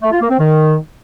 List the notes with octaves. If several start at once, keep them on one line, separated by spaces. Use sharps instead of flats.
A3
F4
A#3
C4
D#3